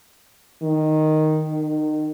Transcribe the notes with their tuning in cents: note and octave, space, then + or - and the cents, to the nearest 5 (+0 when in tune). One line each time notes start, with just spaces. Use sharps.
D#3 -5
D#3 -30